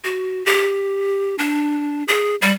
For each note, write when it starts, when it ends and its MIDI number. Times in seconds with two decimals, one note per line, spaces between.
0.04 0.45 66
0.46 1.35 67
1.39 2.03 62
2.08 2.35 68
2.42 2.53 55